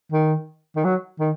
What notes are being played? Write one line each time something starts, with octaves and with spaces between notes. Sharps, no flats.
D#3
D#3
F#3
D#3